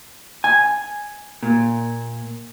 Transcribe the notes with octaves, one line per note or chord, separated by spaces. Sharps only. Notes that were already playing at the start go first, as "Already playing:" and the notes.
G#5
A#2